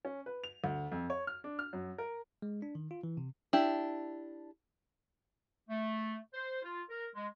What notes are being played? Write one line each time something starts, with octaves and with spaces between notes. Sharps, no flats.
C#4
B4
F7
D2
F2
C#5
F6
D4
F6
F#2
A#4
G#3
D4
D#3
F4
E3
C3
D4 E4 G4
A3
C5
F4
A#4
G#3